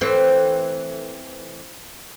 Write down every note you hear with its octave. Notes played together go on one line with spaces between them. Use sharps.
E3 A3 C4